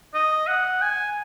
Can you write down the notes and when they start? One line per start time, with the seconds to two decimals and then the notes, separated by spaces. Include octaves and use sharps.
0.14 D#5
0.47 F#5
0.82 G#5